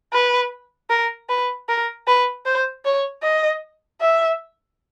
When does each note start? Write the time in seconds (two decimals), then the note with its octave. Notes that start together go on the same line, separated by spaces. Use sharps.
0.13 B4
0.90 A#4
1.29 B4
1.68 A#4
2.07 B4
2.45 C5
2.85 C#5
3.22 D#5
4.01 E5